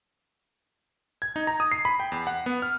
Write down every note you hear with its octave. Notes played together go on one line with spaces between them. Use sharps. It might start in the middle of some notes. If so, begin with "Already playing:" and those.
G#6
D#4
A#5
D#6
C7
B5
G5
E2
F#5
B3
F6